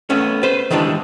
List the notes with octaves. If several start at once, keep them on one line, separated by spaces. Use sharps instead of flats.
A3 B3 C#4
B4 C5
D#3 E3 G3 G#3 D4